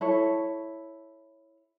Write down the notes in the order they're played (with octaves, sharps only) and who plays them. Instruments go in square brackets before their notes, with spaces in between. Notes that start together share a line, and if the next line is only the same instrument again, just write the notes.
[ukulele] E4 A4 C#5